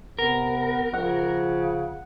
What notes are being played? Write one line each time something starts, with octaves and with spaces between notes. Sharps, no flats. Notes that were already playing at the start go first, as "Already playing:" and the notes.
C3 B3 A#4
C#3 F3 F#5